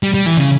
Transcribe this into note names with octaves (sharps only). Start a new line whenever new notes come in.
G3
G3
E3
C#3